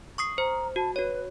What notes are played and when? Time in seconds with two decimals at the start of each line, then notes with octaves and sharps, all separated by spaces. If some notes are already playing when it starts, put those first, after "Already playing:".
0.18 C#6 D#6 C7
0.38 C5 A#5
0.76 F#4 A5
0.96 F#4 B4 C#5